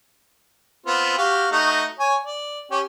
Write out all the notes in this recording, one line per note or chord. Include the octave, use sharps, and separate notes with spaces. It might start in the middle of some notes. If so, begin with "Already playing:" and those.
B3 C4 F4
F#4 G4 F5
A3 D#4 F#4
C#5 G#5
D5
C#4 G4